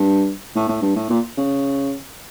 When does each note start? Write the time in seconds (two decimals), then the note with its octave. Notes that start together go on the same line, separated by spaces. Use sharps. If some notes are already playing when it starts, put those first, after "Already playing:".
Already playing: G2
0.55 A2
0.69 A2
0.82 G2
0.96 A2
1.10 A#2
1.38 C#3